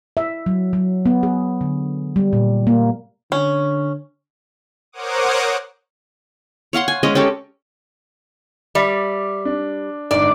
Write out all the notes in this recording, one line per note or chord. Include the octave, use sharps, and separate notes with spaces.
E5
F#3
F#3
B3
G#4
D3
G3
A#2
A#3
D3 C#4
A#4 C5 C#5 F#5 D6 D#6
C#5 F5 F#5 C6
G#5
G#3 C#4 D#5
C#4 G4 A4 C#5
G3 D5 E5 D6
D4
G1 G#2 D5